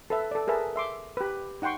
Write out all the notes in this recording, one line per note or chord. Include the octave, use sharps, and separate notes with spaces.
A4 B4 E5
A4 D5
G#4 A#4 B4 E5 A5
E5 C6 D6
G4 B4
D#4 F#5 G5 C6 C#6